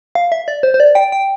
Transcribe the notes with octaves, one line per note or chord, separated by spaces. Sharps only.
F5
E5
D5
C5
C5
D5
G5
G5